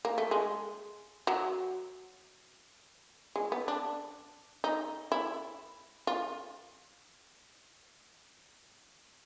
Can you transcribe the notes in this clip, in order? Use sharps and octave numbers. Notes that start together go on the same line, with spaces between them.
A#3
A3
G#3
F#3
G#3
B3
D4
D#4
E4
F4